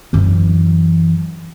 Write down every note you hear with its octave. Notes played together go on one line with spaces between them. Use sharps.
F#2 E3